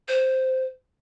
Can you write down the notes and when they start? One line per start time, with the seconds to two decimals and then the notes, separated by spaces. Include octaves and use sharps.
0.08 C5